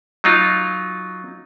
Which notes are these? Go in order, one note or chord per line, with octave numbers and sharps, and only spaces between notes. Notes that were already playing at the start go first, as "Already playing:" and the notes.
F#3 D#4 F4